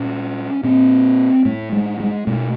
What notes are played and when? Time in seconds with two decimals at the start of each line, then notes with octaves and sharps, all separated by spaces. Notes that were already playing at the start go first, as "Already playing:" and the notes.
Already playing: A#2 C#4
0.64 A#2 C4
1.45 A2 A3
1.72 G#3
2.00 G#3
2.27 B2 A3